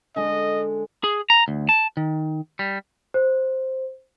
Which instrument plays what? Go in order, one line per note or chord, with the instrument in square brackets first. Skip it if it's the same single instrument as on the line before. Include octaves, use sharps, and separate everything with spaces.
[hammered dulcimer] D3 G#3 [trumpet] D#5
[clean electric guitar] G#4
A#5
D2
A5
D#3
G3
[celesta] C5